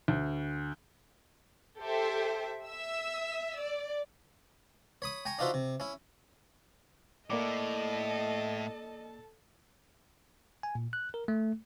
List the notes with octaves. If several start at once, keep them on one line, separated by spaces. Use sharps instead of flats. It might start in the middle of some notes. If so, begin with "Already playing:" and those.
D2
G4 A4 C5 E5
E5 E6
D5
C#5 B5 D#6
G5 G#5 A#5 C#6
D4 D#4 F4 F#4 C5 E5
C3
C#4 E4
A2 A#3 A4 D5 D#5 A5 D6
G#5
A#2
F#6
A#4
A3